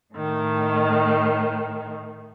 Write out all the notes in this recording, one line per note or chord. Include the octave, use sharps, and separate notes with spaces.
A2 D#3